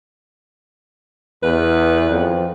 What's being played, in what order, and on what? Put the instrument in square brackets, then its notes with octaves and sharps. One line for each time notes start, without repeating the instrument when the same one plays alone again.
[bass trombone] E2 [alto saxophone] B4
[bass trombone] F2